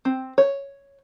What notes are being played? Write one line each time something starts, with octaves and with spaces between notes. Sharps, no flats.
C4
C#5